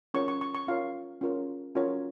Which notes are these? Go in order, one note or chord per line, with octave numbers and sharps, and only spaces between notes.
C#4 F4 A#4 C#5 C#6
C#6
C#6
C#6
C#4 F4 A#4 C#5 F5
C#4 F4 A#4 C#5
C#4 F4 A#4 C#5